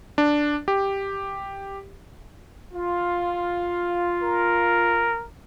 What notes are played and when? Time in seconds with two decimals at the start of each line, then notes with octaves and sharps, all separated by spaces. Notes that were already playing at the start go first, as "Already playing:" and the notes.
0.18 D4
0.68 G4
2.73 F4
4.22 A#4